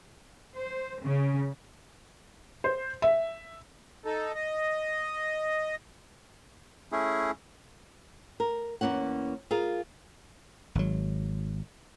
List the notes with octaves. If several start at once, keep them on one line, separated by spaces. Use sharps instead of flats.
C5
C#3
C5
E5
D#4 A4
D#5
A3 C#4 E4 G#4
A#4
E2 G#2 A#3 C#4 F#5
F4 G#4 A#4 F5
G#1 F#3